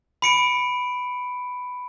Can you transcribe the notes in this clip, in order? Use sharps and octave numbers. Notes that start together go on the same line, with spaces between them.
B5 C#7 D7